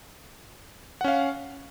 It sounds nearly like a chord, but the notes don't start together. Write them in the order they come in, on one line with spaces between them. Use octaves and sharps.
F#5 C#4 F5